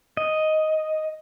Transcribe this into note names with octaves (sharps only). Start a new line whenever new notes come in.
D#5